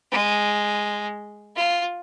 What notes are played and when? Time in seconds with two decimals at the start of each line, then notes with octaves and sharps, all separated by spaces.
0.12 G#3
1.56 F4